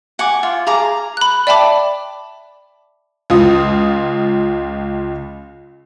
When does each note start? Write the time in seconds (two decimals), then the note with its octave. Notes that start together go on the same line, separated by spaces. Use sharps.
0.19 F#5 G#5 D6
0.43 F4
0.67 G#4 F5 A#5 D6
1.17 B5 F#6
1.47 D5 E5 G5 A5 B5 D6
3.30 C#2 F4 D#6